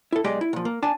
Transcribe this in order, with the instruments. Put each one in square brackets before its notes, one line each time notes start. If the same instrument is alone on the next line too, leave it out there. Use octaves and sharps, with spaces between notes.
[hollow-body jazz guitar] E4 A4
B1 G#3 G4 D5 D#5 A#5
E4
A#2 F3
A#3
D4 G#5 A5